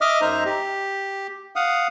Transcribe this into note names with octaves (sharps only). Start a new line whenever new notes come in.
D#5 E5 D6 D#6 F6
F#2 D#4 C5 E5 A#5
G4
F5 F#5 D#6